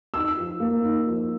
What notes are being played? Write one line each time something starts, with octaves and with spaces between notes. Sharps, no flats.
D#4 E6
F3
A#3
D#4
F3